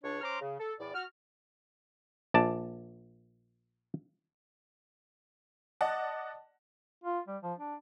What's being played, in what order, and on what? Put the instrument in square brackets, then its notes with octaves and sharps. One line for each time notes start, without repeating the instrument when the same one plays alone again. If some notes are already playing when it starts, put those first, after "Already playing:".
[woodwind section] C#2 D4 C#5
C#4 C5 A#5 C6 D6 F6
C#3
A4
E2 A2 D5
F#4 F6
[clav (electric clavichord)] A#1 D5 A5
[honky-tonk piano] D5 D#5 F#5 A5
[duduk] F4
G3
F3
D4